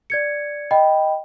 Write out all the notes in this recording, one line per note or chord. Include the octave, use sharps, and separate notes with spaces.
D5 G#6 C#7
D#5 G5 B5